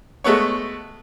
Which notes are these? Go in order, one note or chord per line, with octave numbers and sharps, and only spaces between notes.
G#3 A3 B3 C#5